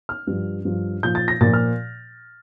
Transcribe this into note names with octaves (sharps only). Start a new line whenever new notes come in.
F6
G2 F3
G2 F3
A#2 F3 G6
A6
A#6
A#2 F3 A6
F6